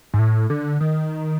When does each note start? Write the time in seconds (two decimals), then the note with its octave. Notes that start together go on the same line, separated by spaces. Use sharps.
0.14 G#2
0.19 A2
0.50 D3
0.81 D#3